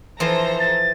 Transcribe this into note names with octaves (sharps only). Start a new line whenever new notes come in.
E3 F3 A4 C5 A#5
A6